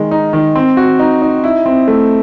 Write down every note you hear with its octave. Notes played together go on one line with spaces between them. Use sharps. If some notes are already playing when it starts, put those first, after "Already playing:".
Already playing: D#3 G#3
D#4
D#3
C4
F#4
D#4
D#4
E4
C4
A3